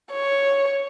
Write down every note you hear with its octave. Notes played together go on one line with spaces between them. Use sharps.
C#5